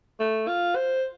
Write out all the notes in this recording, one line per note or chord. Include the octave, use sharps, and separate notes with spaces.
A3
F4
C5